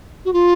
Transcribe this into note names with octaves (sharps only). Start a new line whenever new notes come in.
F#4
F4